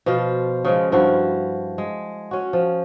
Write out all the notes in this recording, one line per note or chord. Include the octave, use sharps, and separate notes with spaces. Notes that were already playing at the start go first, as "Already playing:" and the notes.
B2 F3 F4 C5
C#3 F3 G#3
G2 F3 E4 F#4
G#3
C#4 F#4
F3